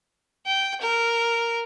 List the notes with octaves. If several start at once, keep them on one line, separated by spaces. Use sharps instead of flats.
G5
A#4